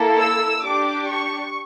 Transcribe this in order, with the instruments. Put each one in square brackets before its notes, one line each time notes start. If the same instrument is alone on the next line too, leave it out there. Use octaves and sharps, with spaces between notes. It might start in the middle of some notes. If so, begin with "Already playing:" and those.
Already playing: [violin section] A#3 E4 A4
E6
D4 G4 D6
C#6